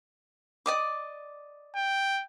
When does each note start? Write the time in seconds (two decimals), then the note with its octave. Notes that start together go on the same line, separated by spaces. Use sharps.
0.66 D5 D#5 D6
1.76 G5